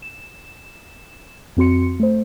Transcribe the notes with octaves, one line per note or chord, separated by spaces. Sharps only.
E7
F2 C4 F#4 C6 C#7
A3 C5